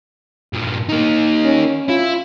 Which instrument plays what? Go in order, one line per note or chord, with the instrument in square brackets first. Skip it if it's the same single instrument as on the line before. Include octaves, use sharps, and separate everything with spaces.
[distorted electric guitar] G2 A#2
A#3 D#4
[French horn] C#4
[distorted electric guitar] E4 [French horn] F4